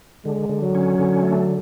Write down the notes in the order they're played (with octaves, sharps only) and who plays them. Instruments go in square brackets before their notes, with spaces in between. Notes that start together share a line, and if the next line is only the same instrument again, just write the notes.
[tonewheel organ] D3 [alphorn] G#3
[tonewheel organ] D3
[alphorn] F#3
[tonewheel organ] C#4
D3
A3